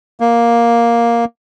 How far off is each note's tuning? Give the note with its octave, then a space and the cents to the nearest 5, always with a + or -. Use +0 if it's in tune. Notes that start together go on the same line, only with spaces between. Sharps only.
A#3 +5